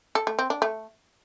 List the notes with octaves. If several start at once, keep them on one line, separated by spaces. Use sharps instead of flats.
A4
A3
C4
D4
A3